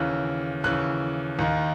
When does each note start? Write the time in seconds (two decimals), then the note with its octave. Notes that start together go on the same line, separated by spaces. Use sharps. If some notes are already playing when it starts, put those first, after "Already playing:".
Already playing: D#2 C#3 E3 F#6
0.64 D#2 C#3 E3 F#6
1.39 D#2 D#3